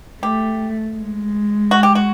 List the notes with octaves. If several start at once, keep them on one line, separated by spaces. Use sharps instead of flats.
A3 G4
G#3
F#4
G4
F#4